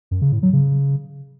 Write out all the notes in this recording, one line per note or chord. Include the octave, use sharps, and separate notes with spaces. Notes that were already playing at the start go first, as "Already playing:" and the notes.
F#2
C#3
A2
F#3
C#3